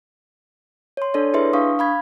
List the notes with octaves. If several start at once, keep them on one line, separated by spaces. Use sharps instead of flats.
C#5 C6
D4 A4 C#5 D5
E4 G#4 B4 E5 C6
D4 F5 C#6 D#6
F5 B5 G#6